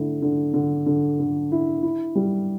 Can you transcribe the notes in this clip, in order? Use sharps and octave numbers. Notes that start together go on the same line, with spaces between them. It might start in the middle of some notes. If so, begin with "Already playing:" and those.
Already playing: D3 A3 E4
D3
D3
D3
D3
E4
E4
G3